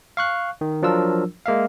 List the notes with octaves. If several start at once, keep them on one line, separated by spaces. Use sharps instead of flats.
F5 C#6 F#6
D#3
F3 F#3 D4 F4 A#4 E6
G#3 A#3 E5 F5